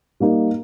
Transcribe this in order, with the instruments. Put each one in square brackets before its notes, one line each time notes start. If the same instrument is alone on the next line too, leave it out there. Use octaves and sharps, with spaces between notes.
[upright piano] G3 A#3 D#4